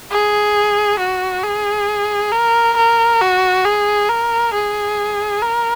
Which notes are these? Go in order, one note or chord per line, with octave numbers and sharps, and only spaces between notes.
G#4
F#4
G#4
A#4
A#4
F#4
G#4
A#4
G#4
A#4